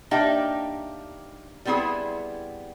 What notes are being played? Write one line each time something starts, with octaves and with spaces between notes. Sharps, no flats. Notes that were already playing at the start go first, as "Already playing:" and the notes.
A#3 D4 D#4 G4 E5 G5
G3 B3 C4 E4 G#4